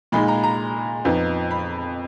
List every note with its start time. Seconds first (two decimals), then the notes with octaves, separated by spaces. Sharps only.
0.12 A#2 G#3 D#4 B5
0.28 A#5
0.44 A#5
1.05 F2 F3 B3 D#4
1.51 B5